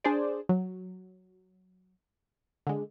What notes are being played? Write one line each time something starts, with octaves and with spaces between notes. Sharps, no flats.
D4 G#4 C5 D5
F#3
D3 G#3